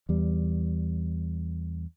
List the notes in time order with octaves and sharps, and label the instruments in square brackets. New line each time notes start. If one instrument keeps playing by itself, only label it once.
[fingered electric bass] E2 G3